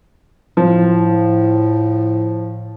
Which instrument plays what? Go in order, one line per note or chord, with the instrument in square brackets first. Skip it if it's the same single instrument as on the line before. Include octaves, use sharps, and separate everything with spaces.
[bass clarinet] A2 [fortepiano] F3